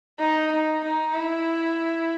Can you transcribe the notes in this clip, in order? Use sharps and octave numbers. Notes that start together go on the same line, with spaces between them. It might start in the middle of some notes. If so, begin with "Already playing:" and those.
D#4
D#4
D#4
E4